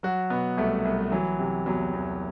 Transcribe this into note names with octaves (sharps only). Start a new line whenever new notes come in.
F#3 F#4
B2 B3
C2 A3
C2
E3 F#3
C3
E2 F#3
E2